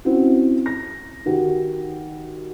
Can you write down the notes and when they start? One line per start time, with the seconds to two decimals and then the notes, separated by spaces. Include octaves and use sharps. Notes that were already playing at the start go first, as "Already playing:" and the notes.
0.05 C4 C#4 E4 F#4
0.66 A#6
1.26 D#3 F#4 G4